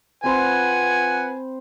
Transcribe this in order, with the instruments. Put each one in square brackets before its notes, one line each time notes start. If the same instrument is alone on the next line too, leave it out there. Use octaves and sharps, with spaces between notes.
[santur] C4 C5 B5 [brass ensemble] F4 B4 F#5 [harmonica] G#5